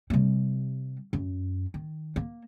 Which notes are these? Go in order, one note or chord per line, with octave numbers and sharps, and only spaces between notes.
C3 G3
F#2
D#3
A#3